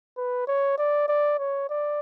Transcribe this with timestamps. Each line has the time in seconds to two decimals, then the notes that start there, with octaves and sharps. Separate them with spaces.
0.17 B4
0.47 C#5
0.78 D5
1.08 D5
1.39 C#5
1.70 D5